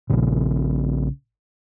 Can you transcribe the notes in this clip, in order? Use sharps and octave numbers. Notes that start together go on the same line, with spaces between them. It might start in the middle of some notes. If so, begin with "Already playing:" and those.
A#1 A#2 C#3